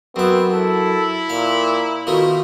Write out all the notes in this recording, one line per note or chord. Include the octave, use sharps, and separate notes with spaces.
F#2 B3 C4 E5
E4 A4
A#2 F5
B2 D#3 A3 F4